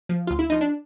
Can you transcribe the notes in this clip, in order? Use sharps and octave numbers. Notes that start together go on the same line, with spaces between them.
F3
D2 F4
E4
F3 D#4
D4